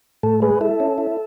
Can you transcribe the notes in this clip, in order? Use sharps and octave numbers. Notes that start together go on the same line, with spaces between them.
A2 A4
G#3 G#4 B4
E4 A4
C#4
E4